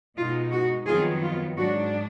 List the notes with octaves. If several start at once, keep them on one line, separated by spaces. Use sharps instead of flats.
B2 G#3 D#4 F4
F#4
F2 D#3 F#3 B3 F4 G#4
F4
G#2 F#3 D4 F#4